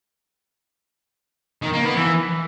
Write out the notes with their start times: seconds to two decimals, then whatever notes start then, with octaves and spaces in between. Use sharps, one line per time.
1.62 D#3
1.73 A#3
1.84 B3
1.96 E3